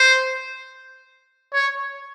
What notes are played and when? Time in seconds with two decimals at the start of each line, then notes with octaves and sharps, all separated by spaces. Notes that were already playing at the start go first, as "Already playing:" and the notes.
Already playing: C5
1.53 C#5